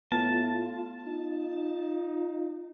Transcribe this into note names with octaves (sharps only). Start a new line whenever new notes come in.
A2 B3 F4 A5
D#4 F4